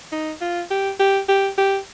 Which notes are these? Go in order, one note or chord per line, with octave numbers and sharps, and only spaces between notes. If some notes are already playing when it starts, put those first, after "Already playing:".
D#4
F4
G4
G4
G4
G4